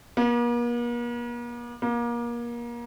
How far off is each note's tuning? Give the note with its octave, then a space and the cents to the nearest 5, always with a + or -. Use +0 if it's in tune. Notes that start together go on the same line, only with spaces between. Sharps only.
A#3 +45
A#3 +30